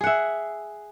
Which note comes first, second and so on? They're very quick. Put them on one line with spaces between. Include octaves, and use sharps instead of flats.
G#4 F#5 E5